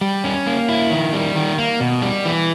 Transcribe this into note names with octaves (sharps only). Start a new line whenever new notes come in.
G3
C#4
A#3
E4
D#3
G3
D#3
A#3
B2
G3
E3